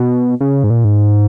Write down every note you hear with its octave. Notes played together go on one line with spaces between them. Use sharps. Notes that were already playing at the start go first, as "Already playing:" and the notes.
Already playing: B2
C#3
G#2
A#2
G#2